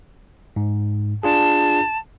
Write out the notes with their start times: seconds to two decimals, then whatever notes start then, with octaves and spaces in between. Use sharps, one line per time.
0.56 G#2
1.23 D4 F4 G#4 A5